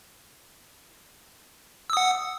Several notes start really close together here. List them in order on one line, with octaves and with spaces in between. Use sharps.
E6 D#6 F#5